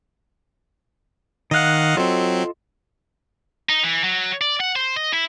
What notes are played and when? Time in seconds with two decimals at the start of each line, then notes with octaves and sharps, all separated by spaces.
1.51 D#3 D#5 F5 F#5 F#6
1.97 F#3 C4 F4 A4 D#5
3.69 D#4
3.83 E3
4.04 F#3
4.41 D5
4.60 F#5
4.76 C5
4.96 D#5
5.13 E4